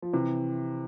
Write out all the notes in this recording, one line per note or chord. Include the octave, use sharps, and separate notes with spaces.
F3
C3 E3